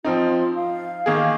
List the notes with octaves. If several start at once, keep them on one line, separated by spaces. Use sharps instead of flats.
F3 C4 D#4 F4
F5
D#3 A#3 G#4